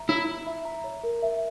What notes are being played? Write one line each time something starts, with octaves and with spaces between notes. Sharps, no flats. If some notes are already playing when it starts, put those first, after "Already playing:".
Already playing: E5 A#5
E4 C#5
C#5
E5
A#5
C#5
A#4
E5